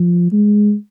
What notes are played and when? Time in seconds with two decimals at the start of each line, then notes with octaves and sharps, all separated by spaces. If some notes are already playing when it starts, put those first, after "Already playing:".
Already playing: F3
0.32 G#3